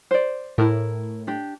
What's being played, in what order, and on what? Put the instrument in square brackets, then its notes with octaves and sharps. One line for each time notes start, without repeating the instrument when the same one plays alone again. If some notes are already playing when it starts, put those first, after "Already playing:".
[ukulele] C5 D5
[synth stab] A2 [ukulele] E4 A#4
[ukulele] D4 G4